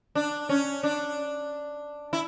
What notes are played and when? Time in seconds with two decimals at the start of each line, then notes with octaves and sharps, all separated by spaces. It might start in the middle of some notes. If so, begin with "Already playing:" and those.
0.15 D4
0.49 C#4
0.83 D4
2.13 E4